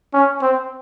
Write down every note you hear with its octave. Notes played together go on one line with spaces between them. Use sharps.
C#4
C4